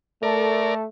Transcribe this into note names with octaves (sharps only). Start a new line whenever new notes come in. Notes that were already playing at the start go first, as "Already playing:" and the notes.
A3 A4 A#4 D5